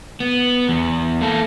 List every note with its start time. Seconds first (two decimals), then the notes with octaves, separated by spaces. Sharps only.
0.20 B3
0.69 E2
1.21 A#3 A4